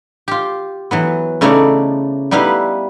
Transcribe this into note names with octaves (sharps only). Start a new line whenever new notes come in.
F4 G4
E3 F#3 B3
C#3 A3 C#4 D#4 E4 D5
G3 B3 D#4 E4 B4 F5